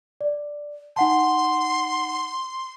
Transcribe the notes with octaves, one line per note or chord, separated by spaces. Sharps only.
D5
D#4 F#5 A5 C6